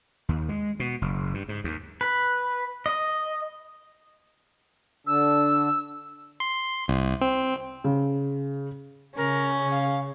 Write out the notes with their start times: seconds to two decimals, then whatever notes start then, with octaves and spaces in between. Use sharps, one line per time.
0.29 D#2
0.49 G#3
0.80 B2
1.02 F#1
1.34 G2
1.49 G#2
1.64 D#2
2.01 B4
2.86 D#5
5.07 D3 D4 E6
6.40 C6
6.88 C2
7.21 C4
7.84 C#3
9.17 C#3 C#4 A#4
9.71 F5